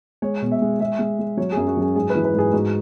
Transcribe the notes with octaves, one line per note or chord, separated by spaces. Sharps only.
G#3 C#5
B2
E5
G#3
G#3 E5
G#3
G#3
F#3 C#5
F#2 G#4
F#4
F#3 G#4
G#2 G#4
B4
E3
B4
G#2
G#4
G#2 F#4